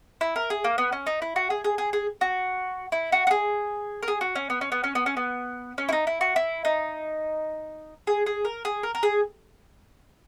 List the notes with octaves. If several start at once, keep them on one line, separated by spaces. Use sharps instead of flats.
E4
A#4
G#4
A#3
B3
C#4
D#4
E4
F#4
G#4
G#4
G#4
G#4
F#4
E4
F#4
F#4
G#4
A#4
G#4
F#4
C#4
B3
C#4
B3
C#4
B3
C#4
B3
C#4
E4
D#4
E4
F#4
E4
D#4
G#4
G#4
A#4
G#4
A#4
A#4
G#4